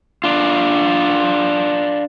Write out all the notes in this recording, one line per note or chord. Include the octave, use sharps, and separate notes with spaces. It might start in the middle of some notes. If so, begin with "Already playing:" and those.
D4 F4